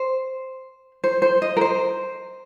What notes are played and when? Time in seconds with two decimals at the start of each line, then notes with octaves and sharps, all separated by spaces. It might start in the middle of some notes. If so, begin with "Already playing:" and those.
Already playing: C5
1.04 C5
1.22 C5
1.42 D#5
1.57 A#4
1.61 C5